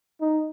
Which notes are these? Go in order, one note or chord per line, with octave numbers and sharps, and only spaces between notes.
D#4